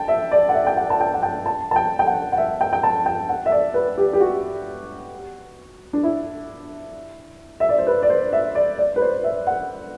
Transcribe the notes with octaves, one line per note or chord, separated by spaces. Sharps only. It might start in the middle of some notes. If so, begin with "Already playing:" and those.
Already playing: G5 A5
E5
D5
F#5
E5
G5
F#5
A5
G5
F#5
G5
A5
A5
G5
G5
F#5
F#5
E5
G5
G5
A5
G5
F#5
E5
D5
B4
G4
G4
F#4
D4
E4
E5
D5
C5
B4
D5
C5
E5
D5
D5
B4
C5
E5
F#5